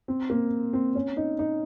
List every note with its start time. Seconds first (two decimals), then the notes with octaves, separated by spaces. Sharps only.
0.08 C4
0.30 A#3
0.73 C4
0.95 C#4
1.17 D#4
1.39 D#4